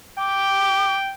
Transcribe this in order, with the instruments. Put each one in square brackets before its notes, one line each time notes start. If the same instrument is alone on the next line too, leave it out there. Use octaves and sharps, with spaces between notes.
[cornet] G5 [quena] D6